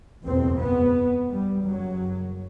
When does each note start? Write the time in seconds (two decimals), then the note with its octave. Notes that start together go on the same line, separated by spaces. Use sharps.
0.24 F#1 E2 B2 C4
0.59 B3
1.29 G3
1.63 F#1 F#2 F#3